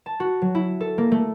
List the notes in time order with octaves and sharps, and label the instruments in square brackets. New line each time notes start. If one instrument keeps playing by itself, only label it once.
[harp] A5
F#4
F#3
E4
A4
A#3
A3